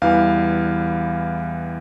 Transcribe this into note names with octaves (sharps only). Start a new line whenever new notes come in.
E2 E3 G3 F5